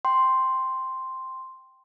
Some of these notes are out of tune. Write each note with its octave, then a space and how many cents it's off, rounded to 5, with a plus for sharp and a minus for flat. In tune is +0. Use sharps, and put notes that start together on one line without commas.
G5 +0 C6 +0